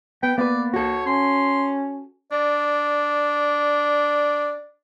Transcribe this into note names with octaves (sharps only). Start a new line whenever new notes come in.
B3 G5
A#3 B3 B4 D5
F#4 A4 C#5
C#4 C6
D4 D5